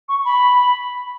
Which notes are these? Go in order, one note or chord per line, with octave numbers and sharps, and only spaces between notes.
C#6
B5